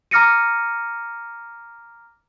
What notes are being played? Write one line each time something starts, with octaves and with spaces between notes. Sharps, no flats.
A#5 D6 F6 A#6 C#7 D#7